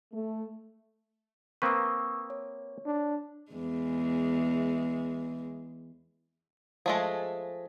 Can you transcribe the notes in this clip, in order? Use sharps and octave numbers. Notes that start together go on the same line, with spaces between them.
A3
A#3 C4 B4 C#6 D#6 E6
C#5
D4
E2 G#3
F3 G#3 A3 G#4